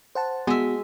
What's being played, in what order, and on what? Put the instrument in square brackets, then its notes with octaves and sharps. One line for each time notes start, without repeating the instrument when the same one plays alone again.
[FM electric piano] C5 F#5 A5
[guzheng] G#3 E5 [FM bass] B3 [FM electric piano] F#4